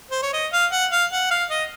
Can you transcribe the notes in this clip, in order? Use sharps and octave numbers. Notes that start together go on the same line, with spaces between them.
C5
C#5
D#5
F5
F#5
F5
F#5
F5
D#5